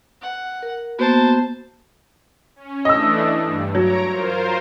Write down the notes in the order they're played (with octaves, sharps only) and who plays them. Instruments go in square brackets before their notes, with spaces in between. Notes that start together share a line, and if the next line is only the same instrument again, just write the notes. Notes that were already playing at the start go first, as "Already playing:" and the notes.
[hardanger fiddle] F#5
[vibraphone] A#4
[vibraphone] A#3 B3 F#4 [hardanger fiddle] C5 A5
[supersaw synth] C#4
[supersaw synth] E3 A3 D4 [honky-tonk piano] D#5 E6
[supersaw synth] G2
[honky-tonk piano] F#3 [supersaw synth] C#5 A#5 D7
[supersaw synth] F4 A#4 C5